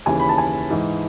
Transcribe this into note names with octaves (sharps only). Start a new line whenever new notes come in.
D#2 C#3 E3 G#5
B5
A5
G#5
G#2 E3